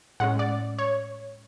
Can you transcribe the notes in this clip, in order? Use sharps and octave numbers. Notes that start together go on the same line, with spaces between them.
A2 G#3 C#4 F#5
D5
C#5